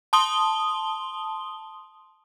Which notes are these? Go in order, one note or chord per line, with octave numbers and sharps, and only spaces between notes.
A5 C6 D#6 G7